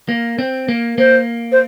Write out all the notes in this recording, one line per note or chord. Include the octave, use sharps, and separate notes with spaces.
A#3
C4
A#3
A#3 C5
C5